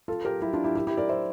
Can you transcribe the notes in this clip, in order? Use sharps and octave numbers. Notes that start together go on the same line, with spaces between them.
F4 A4
G4 A#4
E4 G4
D4 F4
E4 G4
E4 G4
E4 G4
A#4 D5
C5 E5